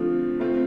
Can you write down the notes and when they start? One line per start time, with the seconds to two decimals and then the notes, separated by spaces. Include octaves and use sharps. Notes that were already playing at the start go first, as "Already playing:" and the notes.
Already playing: D3 F3 A3 C4 F4
0.40 A3 C4 F4